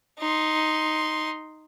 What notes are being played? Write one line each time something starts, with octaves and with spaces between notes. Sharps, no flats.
D#4 C6